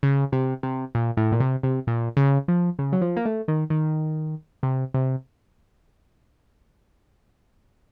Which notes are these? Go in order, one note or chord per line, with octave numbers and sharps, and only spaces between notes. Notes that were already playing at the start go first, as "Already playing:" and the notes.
C#3
C3
C3
A#2
A2
A#2
C3
C3
A#2
C#3
F3
C#3
F#3
F3
A#3
A3
D#3
D#3
C3
C3